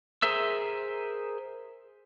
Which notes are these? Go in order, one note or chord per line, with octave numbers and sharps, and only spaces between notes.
G#4 A#4 C5 E5 E6